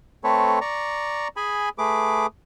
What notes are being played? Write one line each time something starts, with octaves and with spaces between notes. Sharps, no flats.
A3 C4 A4 B4 C#5
D5 A#5 C#6
G#4 G#5 B5
A3 G#4 B4 D6